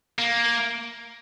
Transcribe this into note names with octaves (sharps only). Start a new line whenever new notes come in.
A#3